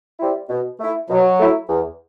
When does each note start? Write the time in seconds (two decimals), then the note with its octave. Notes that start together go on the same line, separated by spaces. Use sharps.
0.19 G3 C4 E4
0.49 B2
0.80 A3 E4
1.10 B2 F#3
1.39 A3 E4
1.69 E2